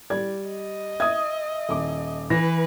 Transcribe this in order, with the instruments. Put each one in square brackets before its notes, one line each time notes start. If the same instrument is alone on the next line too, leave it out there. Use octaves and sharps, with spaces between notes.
[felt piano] G3 D5 G#6
[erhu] D#5
[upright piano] E5 D#6 [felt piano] G#6
[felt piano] D#1 D6
[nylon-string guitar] E3 [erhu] B4 [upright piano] A#6